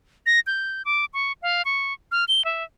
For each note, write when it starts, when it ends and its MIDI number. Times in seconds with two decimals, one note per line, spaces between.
0.26 0.40 94
0.47 0.82 91
0.85 1.05 86
1.14 1.32 85
1.42 1.62 77
1.65 1.93 85
2.12 2.25 89
2.28 2.45 103
2.45 2.64 76